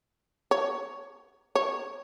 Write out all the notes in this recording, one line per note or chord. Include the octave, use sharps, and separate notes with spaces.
C#5
C#5